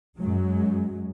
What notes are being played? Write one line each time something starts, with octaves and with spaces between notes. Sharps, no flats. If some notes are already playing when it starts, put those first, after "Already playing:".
F#2 F#3 G#3